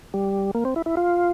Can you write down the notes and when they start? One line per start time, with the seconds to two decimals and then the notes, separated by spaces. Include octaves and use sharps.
0.14 G3
0.55 A#3
0.65 C4
0.76 E4
0.86 E4
0.97 F4